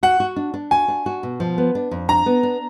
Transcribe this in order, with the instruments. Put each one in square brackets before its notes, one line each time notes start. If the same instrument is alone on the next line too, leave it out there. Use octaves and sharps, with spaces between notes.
[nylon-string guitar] F#4 [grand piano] F#5
[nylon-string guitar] F#4
D4
D4
[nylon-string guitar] F#4 [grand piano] G#5
[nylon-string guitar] D4
F#4
B2
F3
B3
D4
F2
[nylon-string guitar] D4 [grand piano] A#5
[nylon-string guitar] B3
D4